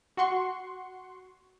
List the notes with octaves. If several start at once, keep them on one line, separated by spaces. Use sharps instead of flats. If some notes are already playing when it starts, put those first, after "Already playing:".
F#4 F#5 C6 C#6